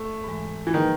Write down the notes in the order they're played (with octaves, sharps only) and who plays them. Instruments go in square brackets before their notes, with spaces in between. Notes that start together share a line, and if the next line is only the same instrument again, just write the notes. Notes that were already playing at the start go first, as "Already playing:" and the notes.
Already playing: [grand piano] A3
[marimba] G#2 E3 G#3
[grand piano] E3
[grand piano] D#3 [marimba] F3 A#3 D#4 G#4 B4